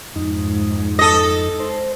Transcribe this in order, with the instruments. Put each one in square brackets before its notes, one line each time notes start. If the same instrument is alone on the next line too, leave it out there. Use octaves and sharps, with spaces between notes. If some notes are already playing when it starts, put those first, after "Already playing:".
[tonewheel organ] F2 D#4 [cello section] G#2
[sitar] A4 D#5
[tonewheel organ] C5